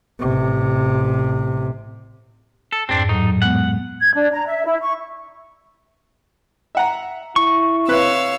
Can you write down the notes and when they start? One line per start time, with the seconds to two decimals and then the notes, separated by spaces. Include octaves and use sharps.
0.19 A1 C3
2.72 A4
2.89 F2 G#2 C4 D4
3.09 A2 F#3 D#4
3.42 G#3 B3 F#5
4.01 G#6
4.15 D4
4.32 A#5
4.47 E5
4.66 E4
4.82 C#6
6.75 E5 F#5 A#5
7.36 E4 C#6
7.88 C3 B4 C#5 F5 E6 F#6